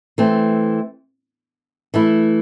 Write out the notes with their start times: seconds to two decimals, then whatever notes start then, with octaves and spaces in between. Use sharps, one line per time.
0.18 E3 A3 C4
1.94 E3 A3 E4